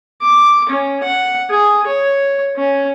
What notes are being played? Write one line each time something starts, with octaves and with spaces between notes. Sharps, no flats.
D6
C#4
F#5
G#4
C#5
C#4